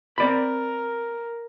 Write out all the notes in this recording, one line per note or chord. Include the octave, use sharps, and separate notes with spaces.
C4 A#4 D5 B5